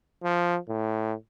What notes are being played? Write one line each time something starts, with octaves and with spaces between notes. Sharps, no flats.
F3
A2